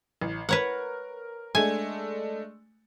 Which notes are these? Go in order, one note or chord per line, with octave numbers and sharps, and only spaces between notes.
A1
A#4 B4 C#5 F#5
G#3 A3 D4 G#5